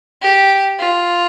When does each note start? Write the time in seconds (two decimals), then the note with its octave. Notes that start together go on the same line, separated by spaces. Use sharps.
0.22 G4
0.79 F4